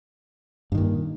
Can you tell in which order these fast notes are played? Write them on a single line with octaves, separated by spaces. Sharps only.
G2 D#3 A#2